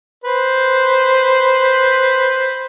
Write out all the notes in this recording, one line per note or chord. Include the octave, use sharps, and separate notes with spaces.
B4 C5